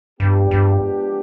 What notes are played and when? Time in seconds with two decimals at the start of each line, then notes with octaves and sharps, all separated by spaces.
0.20 G2 F3 G#3 B3 D4 G4
0.51 G2